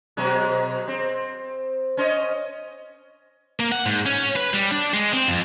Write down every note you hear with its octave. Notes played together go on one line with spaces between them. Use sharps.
B2 F#3 G#3
C4
C#4 C5 D#5
A#3
F#5
G#2
C#4
B4
G3
D4
G#3
C4
F2